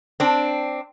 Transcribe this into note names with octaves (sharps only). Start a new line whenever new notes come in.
C4 D4